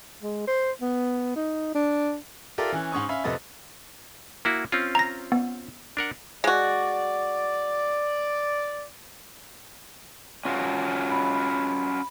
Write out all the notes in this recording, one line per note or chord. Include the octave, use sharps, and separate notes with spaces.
G#3
C5
B3
D#4
D4
F4 G4 A4 A#4 D5 E5
E3 C#4 F#6
G#2 C#4 C#6 D#6
C#4 E5 F5 B5
F2 C3 A3 B4 D#5 A6
A#3 E4 F#4
C4 C#4 F4
A#5 A#6
B3
D4 A#4 F#5
G#3 F#4 D5
C#4 F4 F#4
B5